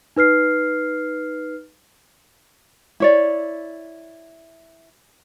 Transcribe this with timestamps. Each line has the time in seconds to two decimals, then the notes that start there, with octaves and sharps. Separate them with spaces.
0.17 D#4 B4 F6 C7
3.00 E4 C#5 D5